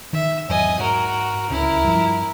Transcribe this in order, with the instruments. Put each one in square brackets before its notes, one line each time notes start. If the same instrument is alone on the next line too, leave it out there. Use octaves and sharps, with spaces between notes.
[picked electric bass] D#3 [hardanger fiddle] E5
[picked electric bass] E2 G#2 F#3 [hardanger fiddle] D#5 G#5
[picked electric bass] G#2 [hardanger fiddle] F#4 A#4
[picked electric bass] D1 C#2 C#4 [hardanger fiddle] E4 A#4
[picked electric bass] G2 F3